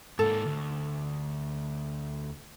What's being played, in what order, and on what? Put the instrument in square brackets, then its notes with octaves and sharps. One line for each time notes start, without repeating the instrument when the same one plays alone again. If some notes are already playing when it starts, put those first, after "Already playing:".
[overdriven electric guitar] G#2 A#3 [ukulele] A4
[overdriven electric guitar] D2